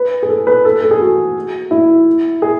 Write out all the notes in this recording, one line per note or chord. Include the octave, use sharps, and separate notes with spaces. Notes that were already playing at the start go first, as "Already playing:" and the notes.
Already playing: B4
G#4
A4
B4
A4
A4
G#4
F#4
E4
G#4